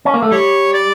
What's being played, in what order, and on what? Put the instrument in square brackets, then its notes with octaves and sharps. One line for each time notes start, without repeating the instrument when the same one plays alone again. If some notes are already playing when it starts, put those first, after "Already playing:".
[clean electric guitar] C#4
A#3
A3
[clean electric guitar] G3 [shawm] C#5
[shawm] D5